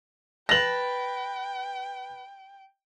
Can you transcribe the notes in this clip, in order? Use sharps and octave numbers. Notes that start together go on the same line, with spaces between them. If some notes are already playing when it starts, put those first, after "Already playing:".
B4 G5 A5 A#6 F7 F#7